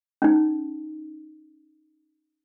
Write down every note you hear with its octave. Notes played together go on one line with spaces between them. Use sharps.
C#4 D#4